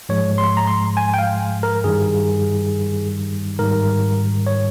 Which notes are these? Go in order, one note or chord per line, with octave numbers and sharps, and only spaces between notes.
G#2 F3 G#3 C#5
C6
A#5
C6
G#5
G5
F5
A#4
G2 D#3 G3 G#4
G#2 D#3 G3 A#4
C#5